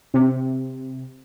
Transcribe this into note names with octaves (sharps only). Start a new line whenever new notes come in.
C3